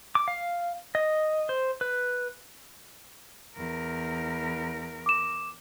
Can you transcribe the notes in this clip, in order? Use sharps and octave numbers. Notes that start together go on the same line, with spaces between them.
D6
F5
D#5
C5
B4
E2 A#4
D6 E7